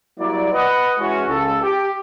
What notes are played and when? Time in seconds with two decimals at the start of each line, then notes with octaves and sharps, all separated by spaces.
0.19 F#3 G3 A#3 E4 D5
0.52 B4 D#5 F#5
0.98 E3 G#3 C#4 F#4
1.27 C#2 A4
1.62 G4